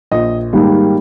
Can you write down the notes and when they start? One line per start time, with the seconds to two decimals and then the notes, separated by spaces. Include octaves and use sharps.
0.12 A#1 D#5
0.53 G#2 D#3 G3 A#3